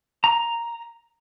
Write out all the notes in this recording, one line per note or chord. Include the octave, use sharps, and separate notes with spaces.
A#5